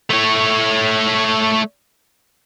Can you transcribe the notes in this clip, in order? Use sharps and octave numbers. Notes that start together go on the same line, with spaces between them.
A3 C#5